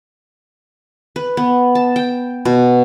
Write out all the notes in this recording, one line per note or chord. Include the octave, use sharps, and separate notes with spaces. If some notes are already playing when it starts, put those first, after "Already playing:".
B4
B3
A5
G5
B2